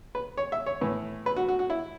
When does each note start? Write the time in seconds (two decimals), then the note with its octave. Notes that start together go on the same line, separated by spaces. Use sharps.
0.15 B4
0.37 C#5
0.52 E5
0.66 C#5
0.81 A2 E3 B3
1.26 B4
1.36 F#4
1.48 F#4
1.59 F#4
1.70 E4